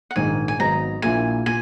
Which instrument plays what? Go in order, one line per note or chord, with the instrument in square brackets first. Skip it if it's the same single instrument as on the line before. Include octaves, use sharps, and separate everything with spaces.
[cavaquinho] F#5
[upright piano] A#1 G#2 D#3 [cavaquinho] G#5
[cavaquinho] G#5
[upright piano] G#1 G#2 F#3 B3 D#4 [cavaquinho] A#5
[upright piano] A#1 A#2 A#3 E4 [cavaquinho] G#5
[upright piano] A#2 [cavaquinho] G#5